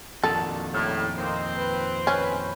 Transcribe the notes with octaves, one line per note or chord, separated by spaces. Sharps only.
F2 A#2 D#3 D4 F#4 A4
A2 C#3 G3
A#3 C4 D#4 C5
B4
C#4 B4